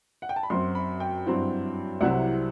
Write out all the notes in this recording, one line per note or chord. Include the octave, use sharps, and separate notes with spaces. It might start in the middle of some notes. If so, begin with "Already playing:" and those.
F#5
G5
A5
B5
F#2 F#3 C4 C6
B5
G5
G2 F#3 C4 E4
C2 C3 F#3 C4 E4 F#5